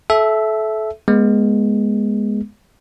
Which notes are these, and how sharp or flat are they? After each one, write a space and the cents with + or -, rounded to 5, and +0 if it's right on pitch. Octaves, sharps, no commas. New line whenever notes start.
A4 -25 E5 +0
G#3 +0 B3 -30